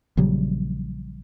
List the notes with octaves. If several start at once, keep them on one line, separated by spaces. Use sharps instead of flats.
A#1 C#3 F#3 G3